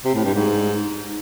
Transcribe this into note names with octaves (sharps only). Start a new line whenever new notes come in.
C3
A2
G2
G#2